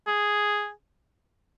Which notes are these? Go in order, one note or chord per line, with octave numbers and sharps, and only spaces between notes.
G#4